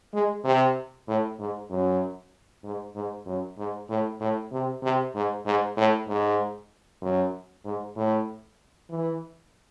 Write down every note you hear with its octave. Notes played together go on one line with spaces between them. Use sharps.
G#3
C3
A2
G#2
F#2
G#2
G#2
F#2
G#2
A2
A2
C3
C3
G#2
G#2
A2
G#2
F#2
G#2
A2
E3